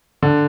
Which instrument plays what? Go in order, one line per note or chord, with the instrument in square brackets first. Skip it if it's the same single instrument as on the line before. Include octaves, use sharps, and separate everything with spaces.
[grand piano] D3